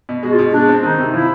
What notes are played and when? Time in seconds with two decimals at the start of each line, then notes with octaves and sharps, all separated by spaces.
0.09 B2
0.23 G#3 F#4
0.33 F4
0.39 B2
0.53 G#3 D4
0.68 C4
0.83 D#3 D#4
0.98 C3
1.13 F3 E4